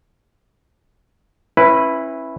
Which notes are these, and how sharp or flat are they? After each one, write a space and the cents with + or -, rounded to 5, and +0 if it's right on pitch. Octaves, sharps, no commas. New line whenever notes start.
C#4 -35 E4 +0 B4 +0